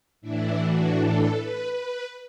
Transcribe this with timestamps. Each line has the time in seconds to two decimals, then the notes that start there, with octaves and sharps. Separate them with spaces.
0.21 A2 E3 D4 E4
0.59 F#4
0.96 A4
1.32 B4
1.71 B4